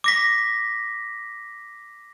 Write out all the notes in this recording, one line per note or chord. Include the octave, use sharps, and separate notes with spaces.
D6 A#6 B6